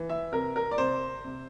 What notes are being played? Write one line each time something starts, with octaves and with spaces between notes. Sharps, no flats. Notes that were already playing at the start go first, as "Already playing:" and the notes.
Already playing: E3
E5
C3 A#4
A#4
D5
C3 C5
C3